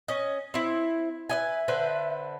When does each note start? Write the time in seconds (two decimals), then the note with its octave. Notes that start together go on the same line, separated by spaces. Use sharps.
0.08 C#4 D#5
0.54 C4 E4
1.29 B4 D#5 E5 G#5
1.68 D3 B4 C5